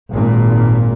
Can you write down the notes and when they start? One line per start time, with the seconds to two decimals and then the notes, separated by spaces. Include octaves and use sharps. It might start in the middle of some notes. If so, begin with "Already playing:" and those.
0.13 G#1 A#2